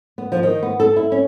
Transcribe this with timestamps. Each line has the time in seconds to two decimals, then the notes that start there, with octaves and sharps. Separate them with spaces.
0.18 B3
0.32 F3
0.43 D#3
0.63 B3
0.80 A4
0.96 E4
1.12 C#4